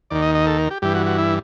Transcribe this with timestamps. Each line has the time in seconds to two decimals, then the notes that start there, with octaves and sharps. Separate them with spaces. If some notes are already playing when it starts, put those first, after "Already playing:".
0.10 D#2 D#3 D5
0.22 D#5
0.35 D#5
0.47 A4
0.58 A#4
0.70 G4
0.82 G2 E3 G4
0.94 F#4
1.06 F#4
1.18 E4